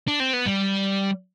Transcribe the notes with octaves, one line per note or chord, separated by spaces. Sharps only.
D4
C4
B3
G3